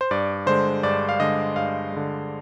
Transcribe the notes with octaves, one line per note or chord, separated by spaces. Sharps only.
C5
G2 D5
D3 G#3 C5
G2 D5
F5
D3 G#3 D#5
G2 F5
D3 G#3